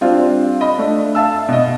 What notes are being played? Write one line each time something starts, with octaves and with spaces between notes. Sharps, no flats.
G3 C4 D4 F4
D#5 B5
A3 D4
E5 F5 A5 E6
B2 D#5